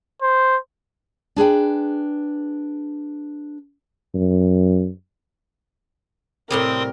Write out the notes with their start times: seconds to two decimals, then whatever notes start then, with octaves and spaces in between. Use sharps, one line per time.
0.22 C5
1.36 D4 G#4 B4 G5
4.15 F#2
6.50 A2 C3 G3 C4 A#4 C6 D#6